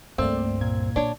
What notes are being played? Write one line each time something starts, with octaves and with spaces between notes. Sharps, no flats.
C#2 G2 A3 A#3 C4 D5
A#2 G#6
D3 D4 C#5